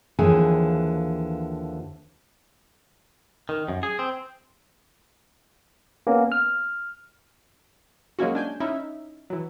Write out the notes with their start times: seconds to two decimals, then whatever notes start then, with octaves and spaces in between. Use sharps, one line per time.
0.19 D#2 D3 E3 F3 G#4 G#5
3.49 D#3
3.68 F#2
3.83 G#4
3.99 C4
6.07 A#3 B3 C#4 A#4
6.32 F6
8.19 F#3 G#3 A#3 C#4 F#4
8.35 D4 G#5 G6
8.60 C#4 D#4 E4 E5
9.30 E3 F#3